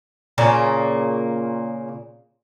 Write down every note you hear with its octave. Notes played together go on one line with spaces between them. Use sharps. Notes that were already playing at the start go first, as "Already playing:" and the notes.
A#2 C#3 A#3